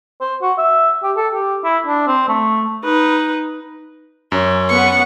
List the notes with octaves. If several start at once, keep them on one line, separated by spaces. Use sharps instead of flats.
C5
F#4
E5
G4
A4
G4
E4
D4
C4
A3
D#4 B4
F#2 C#4
B3 B4 F#5 C#6